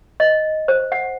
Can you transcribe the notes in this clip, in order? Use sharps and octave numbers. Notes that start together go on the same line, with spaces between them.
D#5
C5
F#5